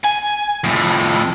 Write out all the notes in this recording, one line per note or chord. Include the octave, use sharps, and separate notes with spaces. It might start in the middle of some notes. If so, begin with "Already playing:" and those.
G#5
F2 A2